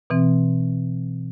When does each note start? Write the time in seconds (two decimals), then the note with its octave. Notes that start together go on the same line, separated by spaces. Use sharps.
0.10 B2 E3 C4